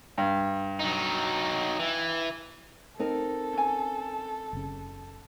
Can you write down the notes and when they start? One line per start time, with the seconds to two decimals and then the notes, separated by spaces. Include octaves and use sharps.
0.18 G2
0.80 F#3 D#4
1.79 E3
2.99 C4 D#4 A4 A#4
3.53 C#4 G#5
4.53 F#1 C#3